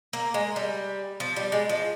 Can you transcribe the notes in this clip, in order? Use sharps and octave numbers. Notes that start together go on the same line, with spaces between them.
A#3
G#3
G3
F3
G3
G#3
F3